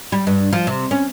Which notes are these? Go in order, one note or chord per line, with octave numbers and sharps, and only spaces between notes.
G3
G2
F3
C3
C#4